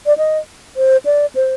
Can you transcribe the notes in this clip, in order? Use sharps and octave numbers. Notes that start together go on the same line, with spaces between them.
D5
D#5
C5
D5
C5